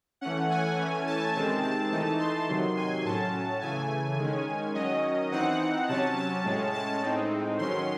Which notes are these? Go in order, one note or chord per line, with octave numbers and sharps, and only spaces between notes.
E3 A3 C#4 F#5
G#5
E3 A3 C#4
A5
C3 D#3 G#3 C4 A5
A5
E3 A3 D#4 A5
C6
C3 D#3 F#3
G#5
A2 F#3 C#4 A5
C#3 E3 A3 G#5
D#3 G#3 C#4
D#3 F#3 C#4 D#5
E3 C4 D#4 F#5
C3 F#3 C#4 A5
A5
A2 G#3 C#4
A5
A2 G#3 C4 D#4
D#3 F#3 C#4 C6